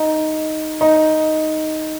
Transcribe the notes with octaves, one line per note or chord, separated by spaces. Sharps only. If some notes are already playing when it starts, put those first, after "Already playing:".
Already playing: D#4
D#4